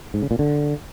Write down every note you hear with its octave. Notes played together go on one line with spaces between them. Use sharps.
G#2
C#3
A#2
D3